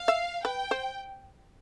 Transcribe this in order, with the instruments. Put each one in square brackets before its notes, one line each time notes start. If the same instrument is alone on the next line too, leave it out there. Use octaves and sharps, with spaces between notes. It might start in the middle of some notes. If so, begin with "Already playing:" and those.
Already playing: [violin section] F5
[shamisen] E5
[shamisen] B4 [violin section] G5
[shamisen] C5